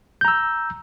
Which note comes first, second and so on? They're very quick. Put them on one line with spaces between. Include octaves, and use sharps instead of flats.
G6 A#5 E6